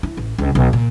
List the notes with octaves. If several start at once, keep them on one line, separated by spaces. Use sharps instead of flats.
E4
A1
C#2
B1
A#2